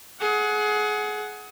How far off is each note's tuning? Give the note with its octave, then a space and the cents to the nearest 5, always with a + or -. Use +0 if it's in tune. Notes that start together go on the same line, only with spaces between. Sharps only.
G#4 +25 F#5 +0